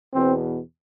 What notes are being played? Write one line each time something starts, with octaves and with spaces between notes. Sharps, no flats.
E2 B2 C4